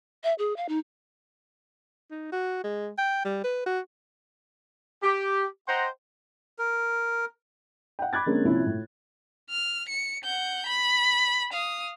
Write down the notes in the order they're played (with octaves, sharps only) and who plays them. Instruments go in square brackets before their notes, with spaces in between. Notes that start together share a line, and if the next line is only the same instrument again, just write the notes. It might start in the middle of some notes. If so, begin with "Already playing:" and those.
[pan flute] E5
G#4
F5
D#4
[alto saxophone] D#4
F#4
G#3
G5
G3
B4
F#4
[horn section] G4
C5 D#5 F#5 G5 A#5 C6
[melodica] A#4
[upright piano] F#5 G5
B5 D6 F#6 G#6 A6
D3 G#3 A#3 C4 C#4
A#1 C3 C#4 E4
A2
[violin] F6
C#7
F#5 G6
B5
F5 D#6